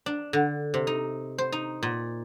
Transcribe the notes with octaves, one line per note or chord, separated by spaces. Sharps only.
D4
D3
C3
D#4
C5
D#4
A#2